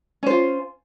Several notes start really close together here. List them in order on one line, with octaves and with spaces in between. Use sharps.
C#4 C5 F4